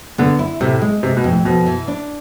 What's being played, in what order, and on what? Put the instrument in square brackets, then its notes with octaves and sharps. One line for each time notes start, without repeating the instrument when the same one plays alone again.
[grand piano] D3 [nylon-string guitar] B3
[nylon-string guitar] E4
[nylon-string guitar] A2 [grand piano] C3
[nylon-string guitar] G#3
[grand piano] C3 [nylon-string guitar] G#3
[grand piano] B2
[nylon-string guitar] F2
[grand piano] A2
[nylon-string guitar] F2 [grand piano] B2
[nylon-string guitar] E3
D4